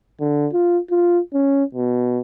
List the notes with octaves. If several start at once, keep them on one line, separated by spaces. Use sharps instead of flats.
D3
F4
F4
C#4
B2